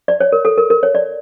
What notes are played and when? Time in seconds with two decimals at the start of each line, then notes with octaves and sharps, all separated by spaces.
0.08 D5
0.20 C#5
0.32 A#4
0.45 A4
0.58 A#4
0.70 A#4
0.83 C#5
0.95 D5